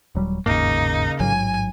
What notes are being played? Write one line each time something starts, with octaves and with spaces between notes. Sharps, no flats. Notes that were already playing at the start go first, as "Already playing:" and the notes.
D#1 F#3 G3
G1 D#2 G#2 C#3 A#3 D#4
A1 G#2 F#3 G#5